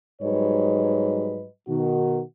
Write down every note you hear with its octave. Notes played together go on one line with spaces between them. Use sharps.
G#2 F#3 G3 B4 C#5 D#5
B2 D#3 F#4